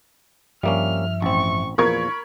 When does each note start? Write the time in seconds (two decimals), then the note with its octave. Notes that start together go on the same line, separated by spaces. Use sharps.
0.63 G2 F3 G3 A#3 C#4 E5 F6
1.22 A1 C4 C#6
1.78 E2 A#2 F3 A#4 B5 C#6 G#6